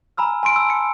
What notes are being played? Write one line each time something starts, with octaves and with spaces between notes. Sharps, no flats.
G#5 A#5 B5 E6 F6
G#5 B5 C6 D7
A5 E6
C#7 D7